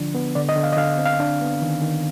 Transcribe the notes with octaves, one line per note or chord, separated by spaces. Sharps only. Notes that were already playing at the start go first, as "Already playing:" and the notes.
Already playing: D3 F3 D4
B3
D3 D5
D#5
D3
F5
D#5
D3 F5
C4
F5
D4
B3
D#3
D#3